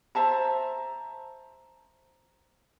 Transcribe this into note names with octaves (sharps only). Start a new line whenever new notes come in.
C5 E5 A5 A#5